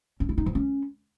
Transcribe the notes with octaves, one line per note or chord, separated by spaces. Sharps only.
C#4
E4
D#4
F3
C#4